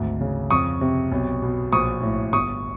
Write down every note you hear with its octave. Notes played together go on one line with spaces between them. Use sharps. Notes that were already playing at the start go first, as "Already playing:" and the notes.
Already playing: G#1 D2 G#2
C#3
F2 C#6 D#6
C3
B1
B2
A#1 C#6 D#6
A2
G1 C#6 D#6